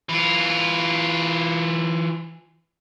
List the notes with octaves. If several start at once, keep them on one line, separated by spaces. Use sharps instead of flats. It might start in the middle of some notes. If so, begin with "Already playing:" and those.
E3 F4